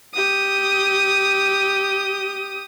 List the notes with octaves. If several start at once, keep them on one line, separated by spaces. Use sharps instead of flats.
G4 D#6